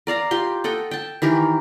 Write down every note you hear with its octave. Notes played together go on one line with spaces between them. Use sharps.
A#4 D5 F5 A#5
F4 G4 C6
A4 D#5 F#5 G5
G5 A5
D#3 E3 G4 A#4